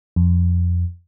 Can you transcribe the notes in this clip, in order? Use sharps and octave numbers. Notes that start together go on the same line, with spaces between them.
F2